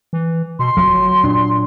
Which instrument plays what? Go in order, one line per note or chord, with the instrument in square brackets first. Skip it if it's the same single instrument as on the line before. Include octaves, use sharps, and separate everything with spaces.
[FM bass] E3
[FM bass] B2 [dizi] C6
[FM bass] G1 [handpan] F#3
[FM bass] A#2 [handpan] D4